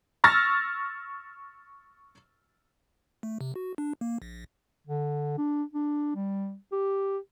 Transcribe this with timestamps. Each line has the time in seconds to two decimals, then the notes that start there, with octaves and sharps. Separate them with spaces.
0.24 C#6 E6 F6 A6 A#6
3.23 A3
3.41 C3
3.56 F#4
3.78 D4
4.01 A#3
4.22 A#1
4.87 D3
5.38 D4
5.73 D4
6.15 G3
6.72 G4